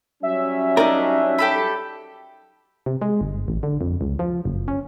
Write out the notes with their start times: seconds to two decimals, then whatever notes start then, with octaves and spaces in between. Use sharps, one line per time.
0.23 F#3 G3 C#4 E5
0.77 D4 D#4 A#4
1.38 G4 A4 B5
2.86 C3
3.02 G#3
3.21 G1
3.48 A1
3.63 D3
3.81 F2
4.01 C#2
4.19 F3
4.45 F#1
4.68 C#4